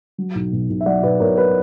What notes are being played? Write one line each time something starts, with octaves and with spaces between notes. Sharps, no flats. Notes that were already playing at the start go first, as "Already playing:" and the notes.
F#3
B1
B2
B1
E5
F#3 D5 F#5
B1 B4 D5
B2 A#4 C#5
B4